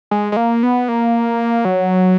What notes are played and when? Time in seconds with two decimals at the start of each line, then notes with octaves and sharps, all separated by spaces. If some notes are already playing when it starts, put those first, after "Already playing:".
0.11 G#3
0.32 G#3
0.37 A#3
0.63 B3
0.88 A#3
1.65 F#3